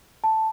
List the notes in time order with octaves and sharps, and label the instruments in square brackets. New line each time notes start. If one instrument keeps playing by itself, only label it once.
[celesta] A5